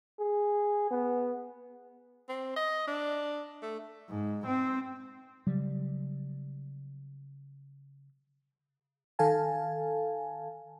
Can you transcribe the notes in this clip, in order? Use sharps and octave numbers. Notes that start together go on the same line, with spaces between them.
G#4
B3
C4
D#5
D4
A3
G#2
C4
C#3 F#3 G3
D#3 A4 F5 G#5 A5